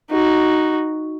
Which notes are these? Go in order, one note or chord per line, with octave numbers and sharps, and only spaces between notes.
D#4 F#4